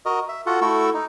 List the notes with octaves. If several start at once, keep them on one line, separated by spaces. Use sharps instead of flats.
F#4 A#4 D#5
E5
F4 F#4 A4 F#5
A3 E4 F#4 A4 C#6 E6
D#4